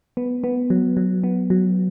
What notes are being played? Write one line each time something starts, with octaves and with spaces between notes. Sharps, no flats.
B3
B3
F#3
F#3
B3
F#3